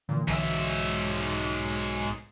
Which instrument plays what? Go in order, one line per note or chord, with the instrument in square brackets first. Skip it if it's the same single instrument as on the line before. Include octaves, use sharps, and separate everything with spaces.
[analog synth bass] A#2 [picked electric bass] D3 E3
[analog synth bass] B1 [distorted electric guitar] G#2 E5